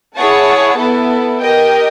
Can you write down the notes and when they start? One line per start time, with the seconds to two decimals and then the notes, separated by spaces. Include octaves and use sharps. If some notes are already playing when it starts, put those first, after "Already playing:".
0.16 E4 G#4 C#5 F#5 A5
0.78 B3 E4 A4
1.40 G4 A#4 D#5 G5